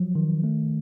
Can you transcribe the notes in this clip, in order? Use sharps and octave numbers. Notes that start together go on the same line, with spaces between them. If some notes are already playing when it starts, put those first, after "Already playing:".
Already playing: F3 F#3
D#3
A3